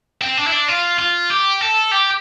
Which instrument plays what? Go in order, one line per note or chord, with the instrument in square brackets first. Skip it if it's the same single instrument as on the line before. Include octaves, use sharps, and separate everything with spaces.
[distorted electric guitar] C4
D4
E4
D4
F4
F4
G4
A4
G4